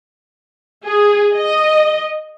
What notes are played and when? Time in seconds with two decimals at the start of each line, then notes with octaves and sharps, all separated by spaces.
0.84 G#4
1.35 D#5